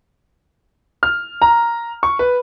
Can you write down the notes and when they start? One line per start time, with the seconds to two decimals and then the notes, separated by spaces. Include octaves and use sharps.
1.03 F6
1.42 A#5
2.03 C#6
2.19 B4